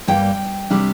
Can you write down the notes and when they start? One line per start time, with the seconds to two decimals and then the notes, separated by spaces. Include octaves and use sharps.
0.08 G2 G3 A#3 G5
0.70 C3 G3 D4